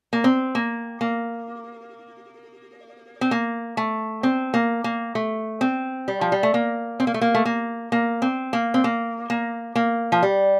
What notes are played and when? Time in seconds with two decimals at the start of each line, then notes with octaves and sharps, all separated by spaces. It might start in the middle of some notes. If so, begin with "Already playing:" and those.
0.13 A#3
0.24 C4
0.55 A#3
1.01 A#3
3.21 C4
3.31 A#3
3.77 A3
4.23 C4
4.54 A#3
4.84 A#3
5.15 A3
5.61 C4
6.08 G3
6.21 F3
6.32 G3
6.43 A3
6.54 A#3
7.00 C4
7.07 A#3
7.14 A3
7.21 A#3
7.34 A3
7.45 A#3
7.92 A#3
8.22 C4
8.53 A#3
8.74 C4
8.84 A#3
9.30 A#3
9.75 A#3
10.12 F3
10.23 G3